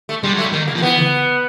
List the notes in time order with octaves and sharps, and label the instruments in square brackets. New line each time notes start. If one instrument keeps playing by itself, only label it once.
[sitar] A3
[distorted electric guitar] G3 [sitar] G#3
[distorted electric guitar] F#3
[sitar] A3
[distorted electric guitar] G3
[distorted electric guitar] D#3 [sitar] A#3
[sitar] A#3
[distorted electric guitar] F3
[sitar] A#3
[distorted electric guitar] E3 [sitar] B3